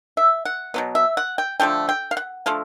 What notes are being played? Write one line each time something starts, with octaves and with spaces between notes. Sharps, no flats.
E5
F#5
B2 F#3 B3
E5
F#5
G5
D3 F3 A3 G5
G5
F5
F#5
D3 F3 A3 F5